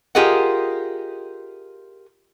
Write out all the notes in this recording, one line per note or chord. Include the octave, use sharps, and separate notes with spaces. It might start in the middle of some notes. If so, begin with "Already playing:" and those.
F4 G4 G#4 A#4 D#5 F#5